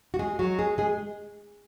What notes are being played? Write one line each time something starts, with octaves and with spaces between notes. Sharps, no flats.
F#4
G#3 G#4
F#3 F#4
G#3 G#4
G#3 G#4